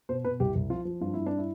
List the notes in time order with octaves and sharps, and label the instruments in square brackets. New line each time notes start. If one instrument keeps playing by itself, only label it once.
[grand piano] B2 C5
B2 B4
C2 G4
C2
F3 F4
F3
G2 F4
G2 E4
D4
E4